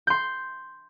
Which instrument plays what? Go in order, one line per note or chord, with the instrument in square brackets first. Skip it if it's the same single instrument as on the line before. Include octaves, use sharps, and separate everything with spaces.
[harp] C6 G6